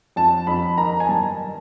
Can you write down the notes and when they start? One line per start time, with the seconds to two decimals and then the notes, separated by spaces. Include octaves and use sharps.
0.16 F2 A5
0.47 F2 B5
0.77 D#3 A#5
1.00 G#5
1.09 G2 A5